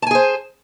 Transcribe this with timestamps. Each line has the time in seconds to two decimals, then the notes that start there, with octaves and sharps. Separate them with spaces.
0.02 A5
0.07 G#5
0.11 G#4
0.15 C5